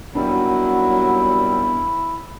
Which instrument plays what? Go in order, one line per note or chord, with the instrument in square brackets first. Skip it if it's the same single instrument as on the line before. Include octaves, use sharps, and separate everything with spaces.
[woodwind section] D#2 G3 C4 [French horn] F#3 [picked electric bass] B3 D4 [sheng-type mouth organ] E4